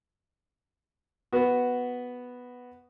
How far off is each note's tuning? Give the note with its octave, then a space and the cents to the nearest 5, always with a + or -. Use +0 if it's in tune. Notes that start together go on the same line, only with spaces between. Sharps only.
B3 +0 F#4 +0